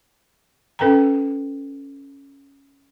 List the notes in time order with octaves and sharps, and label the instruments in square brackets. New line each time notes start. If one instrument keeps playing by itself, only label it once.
[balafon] C#4 A4 B4 G5 A#5